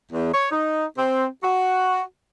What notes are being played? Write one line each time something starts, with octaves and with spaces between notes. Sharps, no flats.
E2
C#5
D#4
C4
F#4